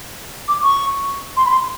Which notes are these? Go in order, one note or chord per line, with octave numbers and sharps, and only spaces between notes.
D6
C#6
C6
B5
C6